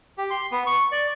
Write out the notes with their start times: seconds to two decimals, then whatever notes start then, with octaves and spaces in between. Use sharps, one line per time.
0.18 G4
0.30 C6
0.52 B3
0.67 C#6
0.92 D5